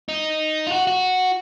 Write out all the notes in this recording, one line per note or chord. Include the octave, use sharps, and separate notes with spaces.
D#4
F4
F#4
F#4